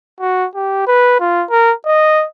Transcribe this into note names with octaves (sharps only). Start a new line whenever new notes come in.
F#4
G4
B4
F4
A#4
D#5